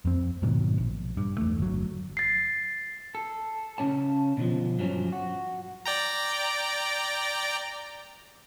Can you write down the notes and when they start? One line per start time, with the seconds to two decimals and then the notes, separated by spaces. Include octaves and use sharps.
0.05 F2 C4
0.42 G#2 B2 D#3 F#3
0.78 A#1
1.17 G2
1.38 E2 A3
1.58 G1 F#3
2.17 A6 C7
3.15 A4
3.78 C#3 F#3 C#4 C#5 A5
4.37 B2 D3 F3
4.79 G2 F3 F#3 C#4
5.13 F#4
5.86 D5 G5 A#5